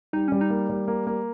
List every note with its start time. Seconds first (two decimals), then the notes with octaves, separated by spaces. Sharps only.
0.13 G3 D#4
0.28 G3 C#4
0.41 D#4
0.50 A#3
0.69 G3
0.88 A#3
1.07 A#3